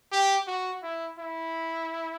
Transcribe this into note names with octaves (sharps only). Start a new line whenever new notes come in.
G4
F#4
E4
E4